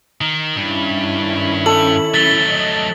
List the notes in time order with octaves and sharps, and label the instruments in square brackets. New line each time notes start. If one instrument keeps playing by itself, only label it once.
[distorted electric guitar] D#3
[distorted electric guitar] G2 [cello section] D#3 C#4 E4
[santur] A4 [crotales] F#7
[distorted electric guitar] F#3 A3 [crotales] A6 B6 G7
[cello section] D#5